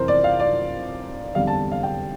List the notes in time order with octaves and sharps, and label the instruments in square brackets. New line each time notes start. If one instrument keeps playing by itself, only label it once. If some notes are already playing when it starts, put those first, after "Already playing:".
Already playing: [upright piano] F2 C3 E3 A#4 C5
D5
F5
D5
E2 D3 G3 C4 F5
A5
F5
G5